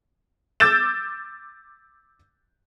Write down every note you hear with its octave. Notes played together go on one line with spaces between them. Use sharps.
D6 E6 G6 A6 E7